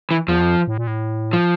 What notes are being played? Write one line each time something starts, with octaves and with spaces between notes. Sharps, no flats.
E3
E2 F3
F2
A2
A#2
A2
F3